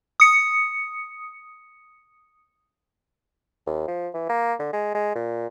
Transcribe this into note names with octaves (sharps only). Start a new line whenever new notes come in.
D#6 C#7
D#2
F3
E3
A#3
D3
G#3
G#3
A#2